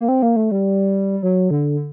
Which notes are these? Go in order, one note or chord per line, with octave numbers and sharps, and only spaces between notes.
A#3
C4
A#3
A3
G3
F#3
D3